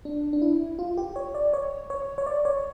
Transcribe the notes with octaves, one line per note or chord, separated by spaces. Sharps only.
D4
D4
E4
F4
G4
C#5
D5
C#5
C#5
C#5
D5
C#5